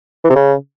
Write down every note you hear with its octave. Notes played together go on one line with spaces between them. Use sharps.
E3
C3
C#3